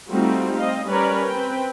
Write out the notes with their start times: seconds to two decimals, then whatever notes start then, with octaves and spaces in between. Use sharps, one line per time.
0.11 G3 A3 C4 D#4 F4 F#4
0.57 C4 D#5 F5
0.87 G3 C#4 A#4 B4 C#5 D5
1.28 C4 B4 G5